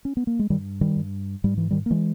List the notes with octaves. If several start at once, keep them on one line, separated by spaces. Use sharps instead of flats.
C#4
B3
A#3
G#3
G2 D#3 G3
D#3 G3
G2
G#2 G3
E3
D#3 G3
A#3
E3 G#3